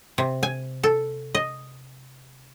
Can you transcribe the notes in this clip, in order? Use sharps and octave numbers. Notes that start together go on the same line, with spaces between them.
C3
G#5
A4
D#5